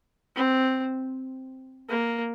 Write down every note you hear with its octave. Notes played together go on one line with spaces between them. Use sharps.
C4
A#3